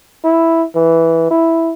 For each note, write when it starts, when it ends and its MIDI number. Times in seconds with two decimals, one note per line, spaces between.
0.24 0.63 64
0.75 1.28 52
1.30 1.73 64